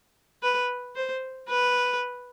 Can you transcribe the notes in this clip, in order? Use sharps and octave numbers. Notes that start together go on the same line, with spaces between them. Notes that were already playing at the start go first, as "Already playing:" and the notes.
B4
C5
B4